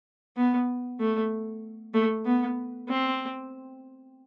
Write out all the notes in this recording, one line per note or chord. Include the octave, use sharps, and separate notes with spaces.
B3
A3
A3
B3
C4